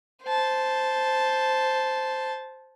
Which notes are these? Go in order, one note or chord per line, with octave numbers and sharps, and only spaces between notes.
C5 A5